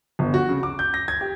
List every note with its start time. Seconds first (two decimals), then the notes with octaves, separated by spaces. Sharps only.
0.19 G1
0.34 F#4
0.49 C#3
0.63 D6
0.79 G6
0.94 A#6
1.08 G#6
1.21 G4